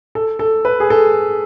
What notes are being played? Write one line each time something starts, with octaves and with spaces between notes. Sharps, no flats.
A4
A4
B4
G#4
A4